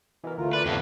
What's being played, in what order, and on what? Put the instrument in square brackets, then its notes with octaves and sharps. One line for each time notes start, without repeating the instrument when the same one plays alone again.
[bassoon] B2 [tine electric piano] E3 A#4
[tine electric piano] D2 [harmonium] D3 A3 F4 [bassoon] A#4
[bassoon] A3 [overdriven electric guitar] B4 [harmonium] D5
[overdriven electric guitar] F2 A2 [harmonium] B3 A4 [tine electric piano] E4 G4